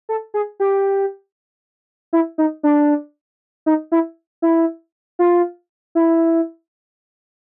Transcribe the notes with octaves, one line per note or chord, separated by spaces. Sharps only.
A4
G#4
G4
E4
D#4
D4
D#4
E4
E4
F4
E4